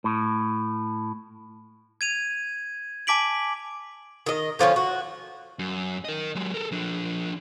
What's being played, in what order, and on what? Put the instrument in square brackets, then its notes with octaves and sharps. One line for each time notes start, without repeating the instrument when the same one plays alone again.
[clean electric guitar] A2
[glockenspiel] G#6 D#7 F7
G#5 A5 D6 B6 D7 F#7
[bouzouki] D#3 D#5
D3 F3 C4 C#4
F#4
[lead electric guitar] F#2
A#4 D#5
F#3 G#3
A4 A#4
F3 D4